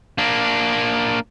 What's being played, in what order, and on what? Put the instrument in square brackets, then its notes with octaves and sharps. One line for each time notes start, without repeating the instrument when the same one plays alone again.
[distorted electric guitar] A#3 D4